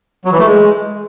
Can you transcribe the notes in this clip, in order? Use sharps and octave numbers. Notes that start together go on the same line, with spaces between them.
F#3
E3
A3
G#3